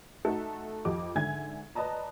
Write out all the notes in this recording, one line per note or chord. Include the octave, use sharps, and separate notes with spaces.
A3 D#4 F#4 A4
F2 G4 D#5 D6
G#2 D3 E5 G#5 G#6
B4 D5 D#5 A5 A#5